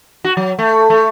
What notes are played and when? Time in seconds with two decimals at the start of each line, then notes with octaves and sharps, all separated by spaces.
0.25 F#4
0.37 F#3
0.59 A3
0.90 A3